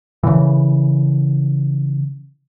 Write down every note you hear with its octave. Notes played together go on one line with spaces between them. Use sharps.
C#3 E3